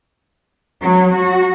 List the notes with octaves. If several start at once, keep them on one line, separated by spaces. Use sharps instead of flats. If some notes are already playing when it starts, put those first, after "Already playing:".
F#3
F#4